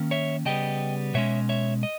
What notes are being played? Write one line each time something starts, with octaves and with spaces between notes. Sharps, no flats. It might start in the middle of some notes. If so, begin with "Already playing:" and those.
Already playing: D#3 A#3 C#4
C#5 E5
C#3 G3 B3 D#5 G5
B2 G#3 C#4 C#5 E5
C#5 E5
D#5